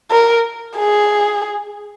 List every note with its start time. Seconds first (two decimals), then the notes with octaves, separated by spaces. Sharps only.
0.11 A#4
0.77 G#4